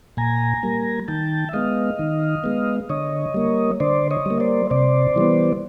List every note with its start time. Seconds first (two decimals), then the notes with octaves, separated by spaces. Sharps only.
0.17 A#2 G#5 A#5
0.63 G3 A#3
1.08 D#3 G5 A5
1.49 E5
1.53 G#3 B3 D#5 F5
1.99 D#3
2.44 G#3 B3
2.89 D3 C#5 D#5
3.34 G3 A#3
3.80 D3 C5 D5
4.11 C#5 D#5
4.26 G3 A#3
4.40 C5 D5
4.70 C3 C5 D5
5.16 E3 G3 B3